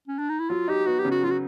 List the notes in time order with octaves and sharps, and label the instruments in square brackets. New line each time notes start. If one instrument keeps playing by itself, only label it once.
[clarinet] C#4
D4
D#4
E4
[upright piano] F#3 [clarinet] F4
[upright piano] D#4 [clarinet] G4
[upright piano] B3 [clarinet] F#4
[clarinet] G4
[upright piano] C#3
[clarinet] F#4
[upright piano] F#3 [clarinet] F4
[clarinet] F#4